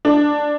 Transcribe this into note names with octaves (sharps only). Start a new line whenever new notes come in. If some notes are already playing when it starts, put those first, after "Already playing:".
D4